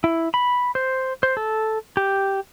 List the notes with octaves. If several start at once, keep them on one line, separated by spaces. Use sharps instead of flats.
E4
B5
C5
C5
A4
G4